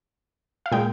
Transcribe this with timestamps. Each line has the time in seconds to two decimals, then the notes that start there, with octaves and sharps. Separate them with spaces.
0.66 F5
0.72 A#2 G#3 G5